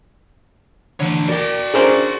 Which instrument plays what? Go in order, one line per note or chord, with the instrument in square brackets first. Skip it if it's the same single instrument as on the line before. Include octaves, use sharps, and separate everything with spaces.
[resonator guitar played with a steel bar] D3 [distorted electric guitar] E3 C#5
[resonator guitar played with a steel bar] A#3 A#4 [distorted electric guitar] F#4 G5 [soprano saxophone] D5
[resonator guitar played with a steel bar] C#4 D4 E4 [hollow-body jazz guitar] G#4 A#4 C5